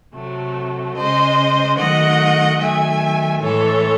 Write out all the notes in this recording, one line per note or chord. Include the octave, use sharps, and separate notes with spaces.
C3 F#3 A3
C#3 G#3 C5 D#5
D#3 F#3 A3 D#5 F#5
D#3 F#3 A3 E5 G#5
A2 E3 G#3 A4 C#5